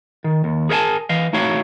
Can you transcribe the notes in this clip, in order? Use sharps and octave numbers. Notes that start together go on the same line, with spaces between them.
D#3
D#2
G#4 A#4 C#5 E5 G#5 A5
E3 D#5 F5
A3 D#4 E4 F#4 C#5 F5